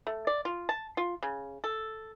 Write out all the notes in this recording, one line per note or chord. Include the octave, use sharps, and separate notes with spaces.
A3
D5
F4
A5
F4
C#3
A4